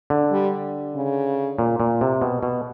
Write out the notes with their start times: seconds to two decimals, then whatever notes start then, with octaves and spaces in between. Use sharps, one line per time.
0.10 D3
0.31 G3
0.95 C#3
1.59 A#2
1.80 A#2
2.01 C3
2.22 B2
2.43 B2